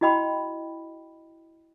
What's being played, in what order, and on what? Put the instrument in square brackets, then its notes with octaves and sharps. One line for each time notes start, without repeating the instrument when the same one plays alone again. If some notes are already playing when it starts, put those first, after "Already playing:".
[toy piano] E4 F#4 D#5 G5 B5